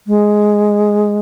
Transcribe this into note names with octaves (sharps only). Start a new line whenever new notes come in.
G#3